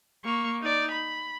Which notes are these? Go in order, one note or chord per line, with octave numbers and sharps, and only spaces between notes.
A#3 C#6
D#4 D5
B5